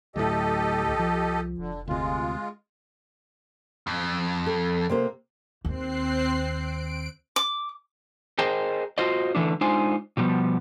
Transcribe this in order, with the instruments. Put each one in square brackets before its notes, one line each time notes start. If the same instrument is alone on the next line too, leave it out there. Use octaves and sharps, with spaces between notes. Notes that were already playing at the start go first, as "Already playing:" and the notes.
[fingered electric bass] D2 A2 [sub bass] F#3 [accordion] G4 A4 D#5
[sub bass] C2
[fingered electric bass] F3
[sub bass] F1 [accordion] D3
[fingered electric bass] D2 C3 [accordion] G#3 F4
[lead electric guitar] F2
[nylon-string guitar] A4
C3 A#3 C5
[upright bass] D#2 [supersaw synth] C4 F#6 C7
[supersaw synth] D7
[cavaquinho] D6
[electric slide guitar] G#4 A#4 C5 D#5 G5
F4 F#4 C5 D#5
D3 E3 A3 D4
G#3 D4 D#4 F4 C5 G#5
B2 F3 G3 B3